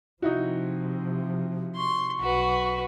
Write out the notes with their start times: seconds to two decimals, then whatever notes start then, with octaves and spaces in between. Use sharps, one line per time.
0.22 C3 F3 D#4 E4 F#4
1.76 C6 C#6
2.20 B1 F#4 B4